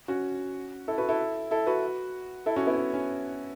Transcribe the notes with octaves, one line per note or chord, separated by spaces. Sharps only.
C#4 F#4
E4 A4
F#4 B4
E4 A4
E4 A4
F#4 B4
E4 A4
C#4 F#4
B3 E4
C#4
C#4